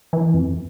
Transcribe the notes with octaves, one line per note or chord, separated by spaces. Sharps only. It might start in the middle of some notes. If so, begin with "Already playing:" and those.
E3
F2